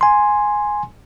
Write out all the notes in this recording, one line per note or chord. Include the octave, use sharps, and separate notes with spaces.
G#5 C6